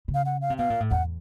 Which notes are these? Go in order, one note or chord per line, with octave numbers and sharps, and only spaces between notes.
C#3
F5
F#5
F5
C3
B2 F5
A#2
A2
E2 F#5